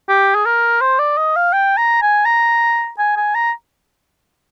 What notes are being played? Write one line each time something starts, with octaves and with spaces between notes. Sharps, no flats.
G4
G#4
A#4
C5
D5
D#5
F5
G5
A#5
G#5
A#5
G#5
G#5
A#5